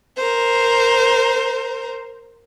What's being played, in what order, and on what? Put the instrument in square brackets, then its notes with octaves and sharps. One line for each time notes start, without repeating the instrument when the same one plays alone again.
[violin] A#4 C5